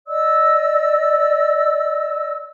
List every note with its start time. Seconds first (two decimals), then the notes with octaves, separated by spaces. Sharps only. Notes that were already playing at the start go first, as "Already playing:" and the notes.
0.07 D5 D#5 E6